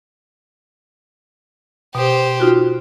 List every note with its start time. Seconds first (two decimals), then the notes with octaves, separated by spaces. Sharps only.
1.95 B2 G4 C5
2.40 D#4 F4 F#4